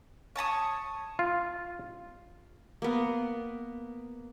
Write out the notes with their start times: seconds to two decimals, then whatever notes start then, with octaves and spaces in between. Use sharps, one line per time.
0.36 C#5 A5 A#5 D#6
1.19 F4
2.82 A#3 B3